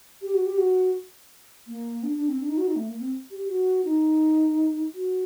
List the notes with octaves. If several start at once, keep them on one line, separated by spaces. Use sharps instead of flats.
G4
F#4
G4
F#4
A#3
D4
D4
C4
D4
D#4
F#4
D#4
A3
A#3
C4
G4
F#4
D#4
F#4